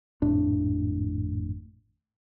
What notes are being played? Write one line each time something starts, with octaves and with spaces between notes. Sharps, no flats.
G#1 F2 A2 D4